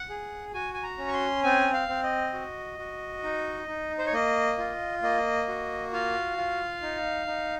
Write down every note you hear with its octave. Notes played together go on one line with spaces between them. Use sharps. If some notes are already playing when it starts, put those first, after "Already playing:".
Already playing: F#5
G#4
F#4 G#5
G#5
A#5
C#4
C#6
C6
C4 G#5
F5
C4
D#5
F#4
F#4
D#4
D#4
C5
C#5
A#3 D#5
F4
A#3 D#5
F#4
F4 F5
F4
D#4
D#4